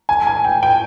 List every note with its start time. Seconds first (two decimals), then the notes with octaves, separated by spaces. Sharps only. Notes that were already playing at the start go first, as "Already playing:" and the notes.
0.09 G#5
0.27 G#5
0.45 G5
0.63 G5